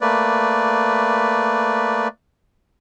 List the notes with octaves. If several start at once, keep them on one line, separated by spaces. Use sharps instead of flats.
A3 A#3 B4 D5